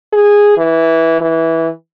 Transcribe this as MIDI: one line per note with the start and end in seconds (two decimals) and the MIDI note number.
0.13 0.54 68
0.58 1.20 52
1.21 1.69 52